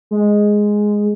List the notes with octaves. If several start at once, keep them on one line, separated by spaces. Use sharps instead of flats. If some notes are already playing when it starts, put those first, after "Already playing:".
G#3